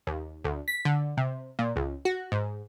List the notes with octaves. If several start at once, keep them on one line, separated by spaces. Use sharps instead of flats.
D#2
D2
B6
D3
C3
A#2
C#2
F#4
G#2